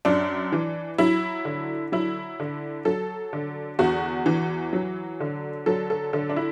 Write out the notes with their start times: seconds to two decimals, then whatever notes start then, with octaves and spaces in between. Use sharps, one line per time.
0.05 F#2 D4
0.52 E3
0.98 F#3 E4
1.45 D3
1.92 F#3 E4
2.40 D3
2.85 F#3 A4
3.33 D3
3.79 E2 F#4
4.26 E3
4.73 F#3
5.20 D3
5.66 F#3 A4
5.90 A4
6.13 D3 A4
6.29 D4
6.36 E4